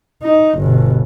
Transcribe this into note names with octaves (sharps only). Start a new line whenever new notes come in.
D#4
G1 B2